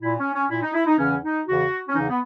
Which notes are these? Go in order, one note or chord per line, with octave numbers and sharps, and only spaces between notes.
A#2 E4
C#4
C#4
A#2 E4
D#4
E4
D#4
E2 C#3 E3 C#4
D#4
E2 C#3 E3 F#4
C#4
E2 C#3 E3 D#4
B3